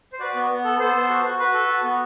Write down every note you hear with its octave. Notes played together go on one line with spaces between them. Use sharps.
C5
F#4 B4 D5
B3
B3
A4
B3 A4 C5
B3
F#4
F#4
F#4 B4
A4
F#4
B3